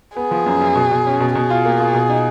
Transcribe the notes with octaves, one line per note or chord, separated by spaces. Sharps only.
B3 G#4
F3
F#2
F#2
B2
B2
C#4
B2
B2 G#4
F4
A#3
F4
B2
D#4